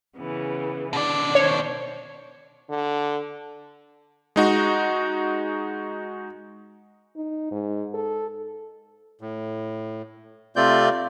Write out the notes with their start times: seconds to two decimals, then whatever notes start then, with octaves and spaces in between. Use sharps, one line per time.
0.18 C#3 E3 B3
0.93 B2 D4 D5
1.35 D#3 C5 C#5
2.70 D3
4.36 G#3 D#4 F#4
7.16 D#4
7.52 G#2
7.94 A4
9.21 A2
10.56 C3 A3 C4 F4 D5 G6